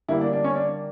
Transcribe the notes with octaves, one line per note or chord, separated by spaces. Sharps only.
D3 G3 A#3 E4
D4
D4
C#4
D4